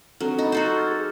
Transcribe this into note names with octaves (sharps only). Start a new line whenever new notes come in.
F#3 C4 D4 A4
D#4 D#5 B5
F#4 A4 C5
F6 G#6 A6
G#4